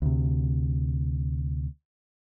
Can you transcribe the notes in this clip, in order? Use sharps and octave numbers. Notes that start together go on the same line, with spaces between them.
D2 C3